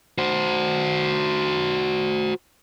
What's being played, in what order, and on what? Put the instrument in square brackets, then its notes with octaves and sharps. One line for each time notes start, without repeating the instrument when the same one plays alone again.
[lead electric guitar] F#4 C5